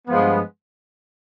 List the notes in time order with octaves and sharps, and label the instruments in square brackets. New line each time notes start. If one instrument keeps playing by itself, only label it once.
[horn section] G2 F3 G#3 B3